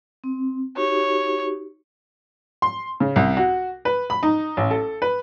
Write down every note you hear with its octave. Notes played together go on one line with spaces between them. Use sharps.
C4
D#4 F#4 G4 C#5
C6
C#3
C2
F#4
B4
B5
D#4
A1
A4
B4